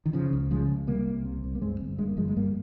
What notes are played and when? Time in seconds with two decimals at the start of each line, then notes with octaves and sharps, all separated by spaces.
0.06 D#3
0.13 C#3 F3
0.33 C#2
0.51 C#3 F3 G#3
0.69 C#2
0.87 C3 G3 A#3
1.07 C2
1.25 C3
1.44 C2
1.55 A#3
1.61 G2 G#3 C4
1.80 G1
1.98 G2 G#3
2.08 A#3
2.17 G1 F3 G#3
2.28 G#3
2.36 G2 G3 A#3